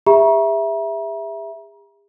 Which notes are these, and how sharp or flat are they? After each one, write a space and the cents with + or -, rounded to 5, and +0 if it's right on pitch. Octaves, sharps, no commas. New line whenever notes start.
G#4 -45 E5 +0 A#5 +40